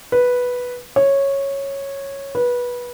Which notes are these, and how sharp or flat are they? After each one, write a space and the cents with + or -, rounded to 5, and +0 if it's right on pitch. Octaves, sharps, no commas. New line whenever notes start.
B4 -5
C#5 -10
B4 -20